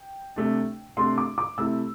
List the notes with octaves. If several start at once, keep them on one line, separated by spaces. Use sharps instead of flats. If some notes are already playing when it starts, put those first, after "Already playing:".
Already playing: G5
C3 A3 D4
C3 A3 D4 C6
D6
D6
C3 A3 E4 E6